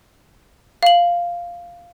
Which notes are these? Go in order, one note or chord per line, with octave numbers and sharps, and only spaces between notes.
F5 F#7